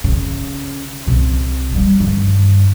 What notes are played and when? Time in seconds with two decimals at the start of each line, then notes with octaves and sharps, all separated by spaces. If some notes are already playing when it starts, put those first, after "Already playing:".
0.04 C#3
1.06 C2 C3
1.73 G3 A#3
2.00 G2 D#3